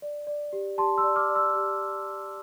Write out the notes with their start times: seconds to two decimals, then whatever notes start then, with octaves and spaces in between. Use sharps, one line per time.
0.02 D5
0.27 D5
0.53 G4
0.78 G4 A5 C6
0.98 C6 E6
1.04 D5
1.16 D6 F6
1.29 D5
1.35 C6 E6
1.55 G4